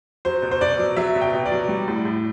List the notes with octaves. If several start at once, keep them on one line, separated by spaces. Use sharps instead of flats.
F#3 C5
B2
C5
B2 D5
F#3
F#3 E5
B2
G5
B2
D5
F#3
G3
A2
A2